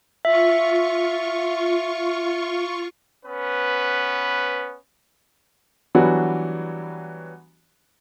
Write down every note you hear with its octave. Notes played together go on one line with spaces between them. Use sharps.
F4 E5 C#6
B3 C#4 B4
E3 F#3 G3 B3 D4 F#4